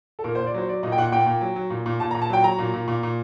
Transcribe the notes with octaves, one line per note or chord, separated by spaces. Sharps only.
A4
A#2 A#4
C5
A#2
D5
F#3 C5
F#3 D5
A#2 D#5
G5
A#2 F#5
A#2 G5
A#2
F#3
F#3
A#2
A#2
A#2 A5
A#5
A#2
A5
F#3 G5
F#3 A#5
A#2
A#2
A#2
A#2